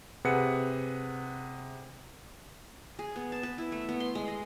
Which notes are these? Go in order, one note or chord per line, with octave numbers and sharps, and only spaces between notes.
C3 G#4 B4 F#5 C#7
G#4
B3
A5
B4
E4
A3
B3
C6
G#3
D#5